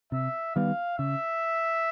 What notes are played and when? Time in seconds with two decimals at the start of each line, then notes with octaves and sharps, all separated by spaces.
0.12 C3 E5
0.56 D#3 G3 B3 F5
0.98 C#3 E5